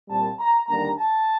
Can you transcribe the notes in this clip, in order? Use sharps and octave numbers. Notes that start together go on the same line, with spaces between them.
C2 A#2 G3 C4 A5
A#5
D#2 D3 G3 A#3 D4 A#5
A5